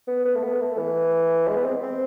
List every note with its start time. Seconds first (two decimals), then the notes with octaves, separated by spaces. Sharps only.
0.08 B3
0.25 B3
0.35 A3
0.43 B3
0.61 A3
0.78 E3
1.48 G#3
1.56 B3
1.65 C4
1.83 C4